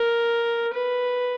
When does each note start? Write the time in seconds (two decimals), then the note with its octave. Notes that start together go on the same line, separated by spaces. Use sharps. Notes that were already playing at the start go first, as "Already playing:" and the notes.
Already playing: A#4
0.73 B4